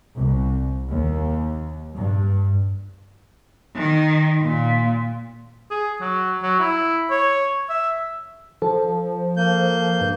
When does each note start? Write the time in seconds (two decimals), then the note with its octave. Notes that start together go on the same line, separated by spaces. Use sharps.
0.17 C2
0.90 D#2
1.94 G2
3.76 D#3
4.41 A#2
5.71 G#4
6.01 F#3
6.43 F#3
6.60 E4
7.10 C#5
7.69 E5
8.62 F3 A4
9.37 A#3 G6
10.01 G2